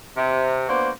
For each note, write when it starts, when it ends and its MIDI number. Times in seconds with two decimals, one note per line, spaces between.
0.17 0.68 48
0.69 0.90 58
0.69 0.90 59
0.69 0.90 62
0.69 0.90 66
0.69 0.90 72